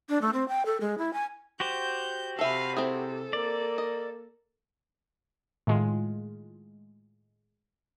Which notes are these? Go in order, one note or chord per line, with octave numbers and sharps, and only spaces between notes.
D4
A3
C4
G5
A4
G#3
E4
G#5
F#4 G4 C5 G6
C3 A4 E5 F5 G#5 B5
C4 E4 G#4 A4
A#3 D5
D#5
A2 D#3 G#3 F4